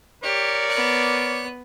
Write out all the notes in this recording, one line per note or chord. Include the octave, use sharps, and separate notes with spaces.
G4 A#4 C#5 D5
B3 F#6